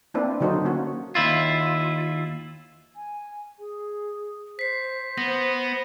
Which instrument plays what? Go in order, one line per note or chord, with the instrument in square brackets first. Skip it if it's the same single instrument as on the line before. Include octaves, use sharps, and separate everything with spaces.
[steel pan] A#3 C4 D4 E4 B4
D3 F#3 D#4 F#4 A4 C5
A#3 C#4 F#4
[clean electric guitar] D#2 E4 F4
[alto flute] G#5
G#4
[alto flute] C5 [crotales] B6 C7
[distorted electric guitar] B3 [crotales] A#6